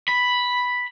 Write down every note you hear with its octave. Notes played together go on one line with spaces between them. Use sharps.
B5